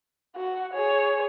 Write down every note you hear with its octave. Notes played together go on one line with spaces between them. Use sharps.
F#4 F#5
G#4 C#5